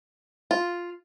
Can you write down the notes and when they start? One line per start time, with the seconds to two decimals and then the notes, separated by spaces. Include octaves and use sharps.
0.51 F4